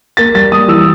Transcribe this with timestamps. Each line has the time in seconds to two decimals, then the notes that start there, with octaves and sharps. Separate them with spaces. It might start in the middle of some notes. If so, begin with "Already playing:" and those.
0.17 A#3 A6
0.34 G3 A6
0.52 G3 D#6
0.68 E3 E6